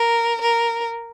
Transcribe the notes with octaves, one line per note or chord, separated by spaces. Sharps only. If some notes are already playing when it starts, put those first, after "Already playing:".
Already playing: A#4
A#4